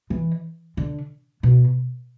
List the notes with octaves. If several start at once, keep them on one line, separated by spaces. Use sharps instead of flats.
E3
D3
B2